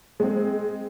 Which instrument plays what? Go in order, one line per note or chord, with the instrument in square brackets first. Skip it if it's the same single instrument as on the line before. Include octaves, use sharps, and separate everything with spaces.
[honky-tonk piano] G#3 C4